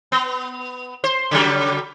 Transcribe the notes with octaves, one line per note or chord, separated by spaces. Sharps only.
B3
C5
C#3 F#3 G3